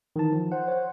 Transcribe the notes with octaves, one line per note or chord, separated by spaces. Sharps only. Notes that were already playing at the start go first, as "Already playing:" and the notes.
D#3 E3 A5
F3
C5 F#5
C#5 F#5